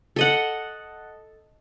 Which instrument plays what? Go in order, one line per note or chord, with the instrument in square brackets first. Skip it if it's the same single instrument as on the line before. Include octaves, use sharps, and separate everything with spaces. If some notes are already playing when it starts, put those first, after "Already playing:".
[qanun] A4 D#5 F#5